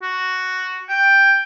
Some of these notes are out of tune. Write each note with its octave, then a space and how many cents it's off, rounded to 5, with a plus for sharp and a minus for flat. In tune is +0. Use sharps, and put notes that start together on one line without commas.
F#4 +0
G5 +10